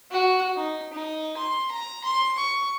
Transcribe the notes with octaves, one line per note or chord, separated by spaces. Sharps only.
F#4
D#4
D#4
C6
A#5
C6
C#6